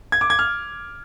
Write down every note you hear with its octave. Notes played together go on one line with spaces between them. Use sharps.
G#6
D6
G#6
F6